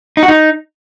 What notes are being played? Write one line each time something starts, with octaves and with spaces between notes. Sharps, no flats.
D#4
F#4
D#4